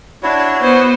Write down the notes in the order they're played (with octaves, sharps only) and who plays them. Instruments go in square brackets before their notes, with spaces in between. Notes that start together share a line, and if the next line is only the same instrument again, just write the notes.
[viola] D4 [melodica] E4 F#4 C#5
[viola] B3 C5